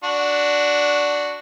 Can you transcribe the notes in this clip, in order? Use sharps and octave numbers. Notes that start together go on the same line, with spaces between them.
D4 F#4